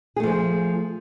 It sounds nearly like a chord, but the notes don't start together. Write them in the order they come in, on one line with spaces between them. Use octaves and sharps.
G#4 A3 F3